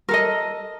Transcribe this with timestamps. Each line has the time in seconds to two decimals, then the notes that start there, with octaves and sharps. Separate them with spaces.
0.09 A#4
0.11 A4
0.14 D#5